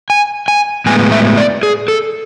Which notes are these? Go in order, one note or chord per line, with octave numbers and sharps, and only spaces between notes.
G#5
G#5
A2 G#3 B3 G#5
E5
D5
G#4
A4